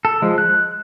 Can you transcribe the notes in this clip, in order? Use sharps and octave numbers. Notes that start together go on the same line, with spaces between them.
A4
F3 G#3
F#6